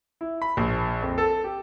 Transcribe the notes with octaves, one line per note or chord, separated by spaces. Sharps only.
E4
B5
A#1
F2
A4
G4